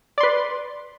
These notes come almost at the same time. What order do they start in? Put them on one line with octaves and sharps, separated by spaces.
D5 C6 B4